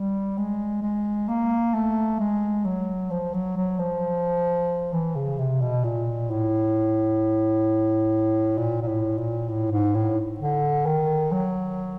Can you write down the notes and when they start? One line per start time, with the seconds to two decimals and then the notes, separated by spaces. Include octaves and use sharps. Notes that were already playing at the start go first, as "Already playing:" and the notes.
Already playing: G3
0.38 G#3
0.83 G#3
1.28 A#3
1.74 A3
2.20 G#3
2.65 F#3
3.10 F3
3.34 F#3
3.57 F#3
3.79 F3
4.93 E3
5.15 C#3
5.38 C3
5.61 B2
5.84 A#2
6.30 A2
8.58 A#2
8.82 A#2
8.88 A2
9.18 A#2
9.49 A2
9.72 G#2
9.94 A2
10.40 D3
10.86 D#3
11.32 F#3